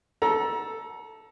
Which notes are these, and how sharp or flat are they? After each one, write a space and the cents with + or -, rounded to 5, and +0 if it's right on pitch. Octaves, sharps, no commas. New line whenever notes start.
A4 +0 A#5 +30